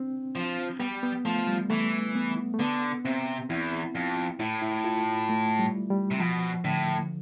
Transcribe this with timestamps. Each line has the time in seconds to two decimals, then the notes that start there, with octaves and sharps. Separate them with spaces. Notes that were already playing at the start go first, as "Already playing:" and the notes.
Already playing: C4 D4
0.35 F3
0.79 G3 B3
1.03 B3
1.25 F3 A3
1.47 G3
1.70 E3 A3
2.16 B3
2.54 A3
2.59 D3 B3
3.04 C3 C4
3.50 E2 E4
3.95 F2
4.40 A2 E4
4.62 E4
4.84 F4
5.29 A3
5.59 G3
5.90 G3
6.11 C3
6.20 B2 F3
6.64 A2 D3